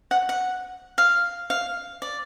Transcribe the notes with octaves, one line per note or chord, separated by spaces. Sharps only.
F#5
F#5
F5
F5
D5